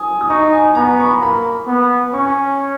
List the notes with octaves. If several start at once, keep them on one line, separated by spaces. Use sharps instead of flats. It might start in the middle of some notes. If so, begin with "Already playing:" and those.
Already playing: G#5 D#6
D#6
D#4 C#6
G#5
B3 A#5
C#6
B5
A#5
A#3 B5
B3
C#4 C#6